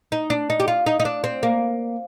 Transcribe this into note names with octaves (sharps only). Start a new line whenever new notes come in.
D#4
D4
D#4
G4
F4
D#4
D#4
D4
C4
A#3